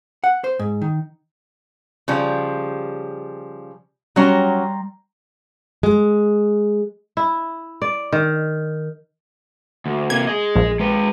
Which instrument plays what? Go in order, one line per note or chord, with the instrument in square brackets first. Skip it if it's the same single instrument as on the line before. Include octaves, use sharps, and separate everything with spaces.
[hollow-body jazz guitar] F#5
C5
G#2
D#3
[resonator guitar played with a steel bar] C#3 F3 G3
[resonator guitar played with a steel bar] F#3 C#4 [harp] G3 A#5 C6
[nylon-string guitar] G#3
[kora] E4
D5
D#3
[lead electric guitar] D2
[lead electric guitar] C3 A#3 [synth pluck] G#6
[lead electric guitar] G#4 D#5
[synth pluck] A#1
[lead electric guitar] G#3 B4